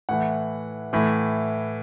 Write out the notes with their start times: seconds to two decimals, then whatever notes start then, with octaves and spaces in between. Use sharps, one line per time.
0.09 A2 E3 F#5
0.93 A2 E3